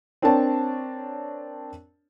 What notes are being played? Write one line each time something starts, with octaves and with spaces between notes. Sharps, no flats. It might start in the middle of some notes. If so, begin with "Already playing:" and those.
C4 D4 A#4 C#5 A5